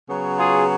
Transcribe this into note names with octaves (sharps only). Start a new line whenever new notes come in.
C#3 F#3 B3
F4 G#4